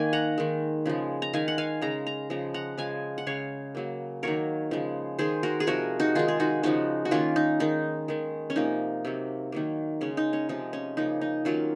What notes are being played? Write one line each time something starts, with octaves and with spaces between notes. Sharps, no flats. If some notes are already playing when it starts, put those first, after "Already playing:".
Already playing: D#3 A#3 G#5
F#5 A#5
D#3 G#3
C#3 F3 G#3
A#5
D#3 G#3 F5 G#5
F#5
F5 G#5
C#3 G#3 A#5
A#5
C#3 F3 G#3 A#5
F#5 A#5
C#3 F3 G#3 F5 G#5
F#5
C#3 G#3 C#5 F5
C#3 F#3 A#3
D#3 F#3 A#3 A#4 C#5
C#3 F3 G#3
D#3 G#3 G#4 C5
F#4 A#4
G#4
C3 F3 G#3 F#4 A#4
D#4 F#4
D#3 G#3 F4 G#4
G#4
D#4 F#4
C#3 F3 G#3 D#4 F#4
F#4
D#3 A#3 C#4 F4
D#4
D#3 G#3 D#4
D#3 G#3
C#4
C3 F3 A#3 D#4
C3 F#3 A#3
D#3 F#3 A#3
C#3 G#3 C#4
D#4
C#4
C3 F3 G#3 D#4
C#4
C#3 F3 A#3 D#4
D#4
D#3 F#3 A#3 C#4 F4